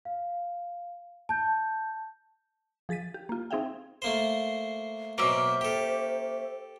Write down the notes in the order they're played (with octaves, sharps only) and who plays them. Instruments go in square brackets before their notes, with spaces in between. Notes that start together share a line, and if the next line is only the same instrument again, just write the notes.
[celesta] F5
A5 G6
[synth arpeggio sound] F3 G#4 A6 B6 D#7
G4
A#3 F4
C4 D#4 G#4 E5 F5 G5
[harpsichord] A3 A#3 C5
[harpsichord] B2 F#3 [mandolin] A#3 C#4 E5 [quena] C5
[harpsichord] G4 A4